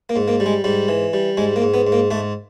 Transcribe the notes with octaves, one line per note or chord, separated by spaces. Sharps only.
A#3
G#2
A#3
G3
G#3
G#2 G3
E3
G3
G#2 G#3
A#3
G#2
B3
G#2
A#3
G#2 A3